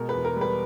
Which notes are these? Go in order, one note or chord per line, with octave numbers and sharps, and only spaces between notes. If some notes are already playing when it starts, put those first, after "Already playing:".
Already playing: B2 G#3 A#4
E2 B4
A#4
G3
B4